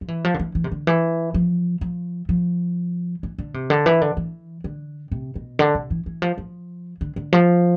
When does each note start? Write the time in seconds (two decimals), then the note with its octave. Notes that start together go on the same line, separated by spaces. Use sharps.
0.01 F3
0.08 E3
0.25 F3
0.34 D3
0.39 E3
0.55 E3
0.64 C3
0.71 D3
0.87 E3
1.34 F3
1.81 F3
2.29 F3
3.23 E3
3.38 D3
3.54 C3
3.70 D3
3.86 E3
4.01 D3
4.17 E3
4.64 D3
5.12 C3
5.35 B2
5.59 D3
5.75 C3
5.91 E3
6.06 E3
6.22 F3
6.38 F3
7.01 D3
7.16 D3
7.33 F3